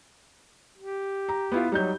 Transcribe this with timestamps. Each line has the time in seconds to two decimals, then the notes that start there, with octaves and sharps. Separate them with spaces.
0.78 G4
1.29 A#5
1.52 B3 E4 F4
1.72 F#3 G3 D#4 G6